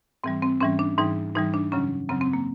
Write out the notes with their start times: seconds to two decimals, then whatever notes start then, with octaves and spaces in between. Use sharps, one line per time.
0.24 G#2 E3 G3 C4
0.42 C4
0.61 G#2 E3 G3 C#4
0.79 D4
0.98 G#2 E3 G3 D#4
1.35 G#2 E3 G3 D#4
1.54 D4
1.72 F#2 C#3 F#3 C#4
2.09 F#2 C#3 F#3 C4
2.21 C4
2.33 A#3